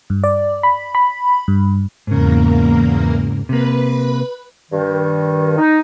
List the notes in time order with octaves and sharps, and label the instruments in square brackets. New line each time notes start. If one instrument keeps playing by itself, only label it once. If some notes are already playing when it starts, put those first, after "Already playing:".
[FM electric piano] G2
D5
B5
B5
G2
[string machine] E2 A#3 A#4 [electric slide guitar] G#2 C#3
[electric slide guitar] C3 A#3 [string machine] B4 B5
[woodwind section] G2 D#3
D#4